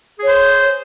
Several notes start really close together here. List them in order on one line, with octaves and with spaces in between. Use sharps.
G#4 C#5 C5